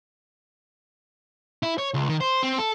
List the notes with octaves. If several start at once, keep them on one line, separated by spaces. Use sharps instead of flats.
E4
C#5
C#2
D#3
C5
C4
A4